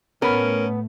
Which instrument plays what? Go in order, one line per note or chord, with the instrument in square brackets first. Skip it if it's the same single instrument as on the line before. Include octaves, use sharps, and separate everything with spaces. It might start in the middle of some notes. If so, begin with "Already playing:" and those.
[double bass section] A2 A3 [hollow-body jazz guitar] B3 B5 [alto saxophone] C#4 [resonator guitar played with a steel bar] A#4